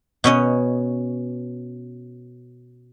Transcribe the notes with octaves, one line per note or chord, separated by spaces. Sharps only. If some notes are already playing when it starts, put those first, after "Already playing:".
B2 C#4 D#5